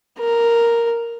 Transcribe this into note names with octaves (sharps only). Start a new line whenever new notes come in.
A#4